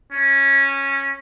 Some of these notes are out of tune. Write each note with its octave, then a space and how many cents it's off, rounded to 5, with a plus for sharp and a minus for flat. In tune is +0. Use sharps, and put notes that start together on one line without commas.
C#4 -10